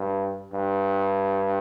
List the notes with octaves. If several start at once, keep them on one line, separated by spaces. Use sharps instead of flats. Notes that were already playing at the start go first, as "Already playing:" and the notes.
Already playing: G2
G2